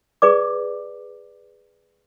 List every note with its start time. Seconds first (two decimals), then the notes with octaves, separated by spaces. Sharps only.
0.22 G#4 B4 D5 D6